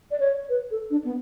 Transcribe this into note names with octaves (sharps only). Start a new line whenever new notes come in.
D5
C#5
B4
A4
D4
B3